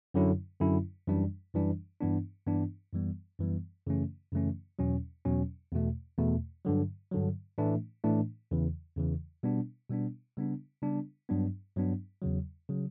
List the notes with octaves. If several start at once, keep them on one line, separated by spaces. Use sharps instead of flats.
F#2 D3 F#3 C#4 E4
F#2 D3 F#3 C#4 E4
F#2 E3 G3 D4
F#2 E3 G3 D4
G2 E3 B3 D4
G2 E3 B3 D4
F#2 E3 G3 B3
F#2 E3 G3 B3
F#2 C#3 E3 A3 C#4
F#2 C#3 E3 A3 C#4
E2 B2 F#3 C#4
E2 B2 F#3 C#4
E2 B2 A3
E2 B2 A3
G2 D3 F#3
G2 D3 F#3
A2 E3 A3 D4
A2 E3 A3 D4
E2 C#3 E3
E2 C#3 E3
B2 G3 B3 D4
B2 G3 B3 D4
C#3 G3 B3 D4
C#3 G3 B3 D4
G2 F#3 B3 D4
G2 F#3 B3 D4
E2 C#3 F#3
C#3 F#3